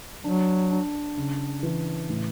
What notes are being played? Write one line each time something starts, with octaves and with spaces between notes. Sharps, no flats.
F#3 D4
D4
C#3
E3
A2